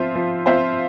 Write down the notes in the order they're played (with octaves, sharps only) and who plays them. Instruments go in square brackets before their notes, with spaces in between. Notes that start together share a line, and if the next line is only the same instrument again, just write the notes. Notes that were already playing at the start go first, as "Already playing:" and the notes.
Already playing: [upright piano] F3 C4 F4 C5 E5
F3
C4 F4 C5 E5